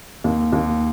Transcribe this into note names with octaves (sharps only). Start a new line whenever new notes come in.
D#2
D#2